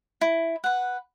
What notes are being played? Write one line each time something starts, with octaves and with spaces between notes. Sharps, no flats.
E4
B4 F#5